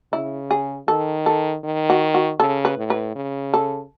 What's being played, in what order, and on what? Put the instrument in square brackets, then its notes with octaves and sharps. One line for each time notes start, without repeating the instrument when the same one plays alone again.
[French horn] C#3 [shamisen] E4
[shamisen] G#4
[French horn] D#3 [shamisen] A4
[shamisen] A4
[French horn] D#3
[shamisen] F#4
F#4
[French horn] C#3 [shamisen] A4
[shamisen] B4
[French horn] A2
[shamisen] B4
[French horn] C#3
[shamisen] A4